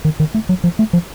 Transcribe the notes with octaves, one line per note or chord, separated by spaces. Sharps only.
D#3
D#3
A3
F#3
F3
A3
F3